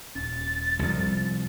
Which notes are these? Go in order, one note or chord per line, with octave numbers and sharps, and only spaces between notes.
D#1 C#4 A6
C2 F2 F3